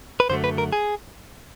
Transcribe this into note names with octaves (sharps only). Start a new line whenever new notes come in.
B4
F#2 D3 F#3 A3 C5
B4
A#4
G#4